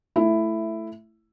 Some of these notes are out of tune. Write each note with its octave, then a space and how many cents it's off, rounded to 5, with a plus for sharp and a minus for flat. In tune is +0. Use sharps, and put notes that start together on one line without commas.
A3 +0 E4 +10